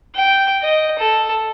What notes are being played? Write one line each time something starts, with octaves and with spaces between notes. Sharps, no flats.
G5
D#5
A4